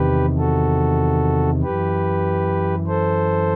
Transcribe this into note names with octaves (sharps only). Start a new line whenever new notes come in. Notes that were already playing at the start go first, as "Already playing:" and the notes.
Already playing: E2 C3 D#3 G4 B4
F#4 A4
F#2 E3 G4 B4
A4 C5